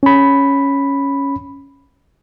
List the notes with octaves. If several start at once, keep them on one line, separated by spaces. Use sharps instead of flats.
C#4 B5